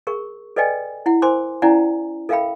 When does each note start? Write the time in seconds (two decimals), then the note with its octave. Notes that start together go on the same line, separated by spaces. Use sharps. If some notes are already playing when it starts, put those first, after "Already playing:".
0.07 G#4 A#4 C#6
0.56 A4 B4 D5 D#5 G5 G#5
1.06 E4 F#5
1.22 A#4 C5 G#5 C6 D6
1.62 C#4 E4 D5 F#5 G#5 A#5
2.29 A4 A#4 E5 F5 G5 B5